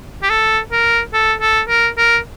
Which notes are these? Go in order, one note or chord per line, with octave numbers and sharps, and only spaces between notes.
G4
A4
A#4
A4
A4
A#4
A#4